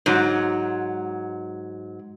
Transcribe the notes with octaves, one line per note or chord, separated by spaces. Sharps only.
G#2 F#3